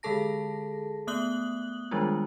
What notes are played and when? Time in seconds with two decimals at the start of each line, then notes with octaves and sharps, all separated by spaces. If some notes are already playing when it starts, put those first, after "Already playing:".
0.03 D3 G#3 G#4 A4 A5 A#6
1.07 A3 B3 D#6 F#6 F#7 G7
1.91 D#3 F3 G3 G#3 D4 F4